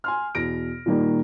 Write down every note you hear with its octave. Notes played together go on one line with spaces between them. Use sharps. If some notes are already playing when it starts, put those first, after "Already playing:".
G#5 C6 F6
E2 B2 A#6 D7
A#2 D#3 G3 A#3